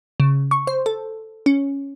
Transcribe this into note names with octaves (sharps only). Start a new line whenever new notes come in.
C#3
C#6
C5
A4
C#4